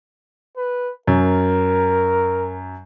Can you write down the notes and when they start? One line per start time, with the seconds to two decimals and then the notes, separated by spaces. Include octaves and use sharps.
0.57 B4
1.07 F#2 A#4